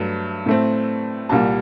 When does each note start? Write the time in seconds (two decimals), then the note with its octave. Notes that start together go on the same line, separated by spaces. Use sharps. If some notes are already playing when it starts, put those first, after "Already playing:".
Already playing: G2 F#3 A3
0.46 A2 A3 C4
1.29 C2 A#2 G3 A5